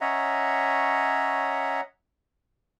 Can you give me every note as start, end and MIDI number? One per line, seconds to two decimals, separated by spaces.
0.01 1.81 61
0.01 1.81 73
0.01 1.81 75
0.01 1.81 76
0.01 1.81 78
0.01 1.81 82